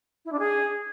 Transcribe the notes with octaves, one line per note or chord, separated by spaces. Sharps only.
E4
D4
G#4